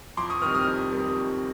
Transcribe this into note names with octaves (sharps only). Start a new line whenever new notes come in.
F2 C6 D6
C#6 D#6
C3 D#3 G3 C4 D#6 F6
D#6 F6
F2
C3 D#3 G3 C4
F2